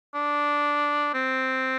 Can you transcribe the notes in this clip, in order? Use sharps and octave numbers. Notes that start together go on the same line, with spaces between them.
D4
C4